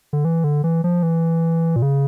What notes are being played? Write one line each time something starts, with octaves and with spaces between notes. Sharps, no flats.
D3
E3
D3
E3
F3
E3
A#2
C#3